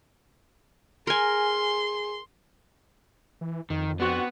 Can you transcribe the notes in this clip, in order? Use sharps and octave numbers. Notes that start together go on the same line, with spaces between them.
G#4 A#4 G#5 C6
E3
F2 D#3
B3 C4 D4 F#4